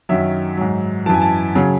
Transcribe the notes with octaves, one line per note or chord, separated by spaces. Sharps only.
F#2 D#3 F#3 E5
G#2 F#3
F#2 E3 G#5 A5
A5
C#3 F#3